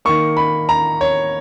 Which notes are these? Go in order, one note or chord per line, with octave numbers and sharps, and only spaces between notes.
D#3 A#3 C#6
B5
A#5
C#5